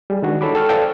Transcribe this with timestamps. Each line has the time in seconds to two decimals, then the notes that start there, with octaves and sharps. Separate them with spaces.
0.10 G3 G#4
0.22 D#3 G#3 D4 F#4
0.41 D#4 E4 A4 C#5 B5 D6
0.55 A4 G5 C#6 F6
0.69 A4 B4 C5 D5 F5 G5